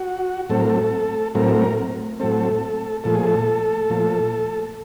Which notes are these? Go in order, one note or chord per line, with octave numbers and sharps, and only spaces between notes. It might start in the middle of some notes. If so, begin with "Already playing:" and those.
Already playing: F#4
A2 F#3 A3 C4 A4
A#4
A4
A2 F#3 A3 C4 A#4
A2 F#3 A3 C4 A4
A#2 F3 A3 A4
G#4
A4
A#2 F3 A3